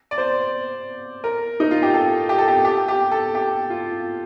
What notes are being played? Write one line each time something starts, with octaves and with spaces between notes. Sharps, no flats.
D5
C5
A#4
D#4
F4
G4
A4
G4
A4
G4
G4
G4
A4
G4
F4